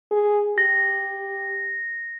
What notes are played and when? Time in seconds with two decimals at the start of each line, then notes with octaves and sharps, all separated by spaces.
0.11 G#4
0.58 G4 A#6